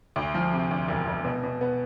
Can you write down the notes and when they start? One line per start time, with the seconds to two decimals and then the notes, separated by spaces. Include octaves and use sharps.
0.16 D2
0.34 F3
0.53 C3
0.71 D2
0.88 E1
1.07 E1
1.25 B2
1.43 B2
1.61 B3